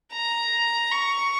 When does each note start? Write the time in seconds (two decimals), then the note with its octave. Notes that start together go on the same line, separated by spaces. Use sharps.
0.13 A#5
0.92 C#6